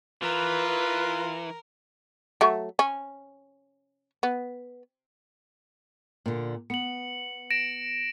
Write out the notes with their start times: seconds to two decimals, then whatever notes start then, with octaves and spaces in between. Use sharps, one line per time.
0.22 E3 F4 A#4 B4
2.41 F#3 A3
2.79 C#4
4.23 B3
6.26 A#2 D3
6.70 B3 C#7 F#7
7.51 A#6 D7 E7